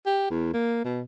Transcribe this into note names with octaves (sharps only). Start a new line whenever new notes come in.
G4
E2
A#3
B2